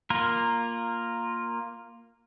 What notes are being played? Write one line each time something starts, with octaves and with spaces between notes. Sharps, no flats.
A#3 F4 A#4